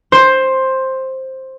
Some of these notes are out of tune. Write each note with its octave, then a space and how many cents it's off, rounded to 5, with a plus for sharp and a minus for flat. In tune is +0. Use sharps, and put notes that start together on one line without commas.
C5 +10